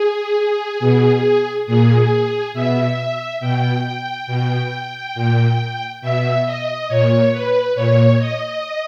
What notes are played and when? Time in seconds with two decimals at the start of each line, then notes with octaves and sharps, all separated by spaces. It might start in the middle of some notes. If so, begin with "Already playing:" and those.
Already playing: G#4
0.80 B2
1.66 A#2 G#4
2.54 B2 E5
3.40 B2 G5
3.84 G5
4.27 B2 G5
5.15 A#2
6.02 B2 E5
6.46 D#5
6.88 A#2 C#5
7.32 B4
7.75 A#2 C#5
8.19 D#5